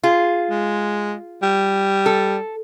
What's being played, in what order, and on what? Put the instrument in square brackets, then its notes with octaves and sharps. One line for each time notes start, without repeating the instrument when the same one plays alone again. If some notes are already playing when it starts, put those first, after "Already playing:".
[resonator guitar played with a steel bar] F4 G#4
[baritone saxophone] G#3
G3
[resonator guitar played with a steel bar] A4